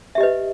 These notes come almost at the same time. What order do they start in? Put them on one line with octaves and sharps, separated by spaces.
E5 G4 D#5 B4